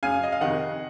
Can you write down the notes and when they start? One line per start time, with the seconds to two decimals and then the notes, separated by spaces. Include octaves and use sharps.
0.03 F#2 C#3 F5 G#5
0.23 D#5
0.32 F5
0.41 F2 C3 D#3 D#5 F#5